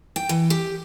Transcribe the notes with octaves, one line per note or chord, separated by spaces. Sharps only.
G5
E3
G4